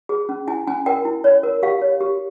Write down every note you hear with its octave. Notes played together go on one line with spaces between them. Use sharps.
G#4
C#4
E4 G#5
C#4 G#5
A#4 G5
E4
C#5
A#4
G4 F5
C#5
G4